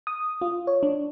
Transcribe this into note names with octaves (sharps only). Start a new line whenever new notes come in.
D#6
F4
C#5
D4